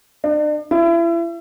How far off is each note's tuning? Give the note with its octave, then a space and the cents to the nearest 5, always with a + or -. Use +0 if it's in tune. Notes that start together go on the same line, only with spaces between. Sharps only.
D4 +40
E4 +35